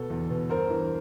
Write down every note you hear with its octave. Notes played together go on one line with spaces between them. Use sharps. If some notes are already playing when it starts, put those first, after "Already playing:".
Already playing: B2 A4
E2
B2
G2 A#4 C5
E3